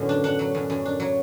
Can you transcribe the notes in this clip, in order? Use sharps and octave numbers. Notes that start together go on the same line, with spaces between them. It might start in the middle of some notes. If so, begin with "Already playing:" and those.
Already playing: F#2 A2 D3 B3 D5
D4
D4 F#5
F#3
F#2
F#2
D4
F#3